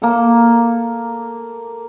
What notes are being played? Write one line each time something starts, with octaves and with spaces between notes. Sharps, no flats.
A#3 A4